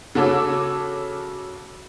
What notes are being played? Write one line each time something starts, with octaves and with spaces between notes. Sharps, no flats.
C#3 F#4 A4 C#5 D6 E6